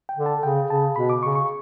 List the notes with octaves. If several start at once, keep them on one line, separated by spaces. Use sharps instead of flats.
G5
D3
A5
C#3 G5
C#3 A5
B2 B5
D6
C#3 C#6
C#6